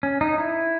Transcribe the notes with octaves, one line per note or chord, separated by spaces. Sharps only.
C#4
D#4
E4